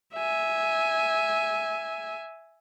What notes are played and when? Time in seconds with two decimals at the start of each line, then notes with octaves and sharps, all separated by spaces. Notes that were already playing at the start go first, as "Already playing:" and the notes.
0.14 E5 G#5